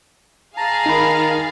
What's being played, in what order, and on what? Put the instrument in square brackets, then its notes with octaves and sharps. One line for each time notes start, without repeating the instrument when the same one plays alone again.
[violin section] G#4 F5 [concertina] A5 A#5
[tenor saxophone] D#3 [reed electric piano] D#4 B5